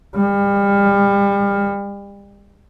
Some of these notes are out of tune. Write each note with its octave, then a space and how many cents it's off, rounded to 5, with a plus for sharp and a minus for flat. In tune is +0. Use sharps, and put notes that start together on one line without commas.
G3 +35